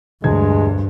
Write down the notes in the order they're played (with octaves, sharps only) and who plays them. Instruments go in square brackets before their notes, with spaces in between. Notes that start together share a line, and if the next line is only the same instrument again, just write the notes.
[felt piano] E1 D2 G#6 [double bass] G2 [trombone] G#3